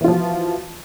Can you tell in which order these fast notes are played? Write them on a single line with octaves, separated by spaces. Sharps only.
E3 F4 F3 F#4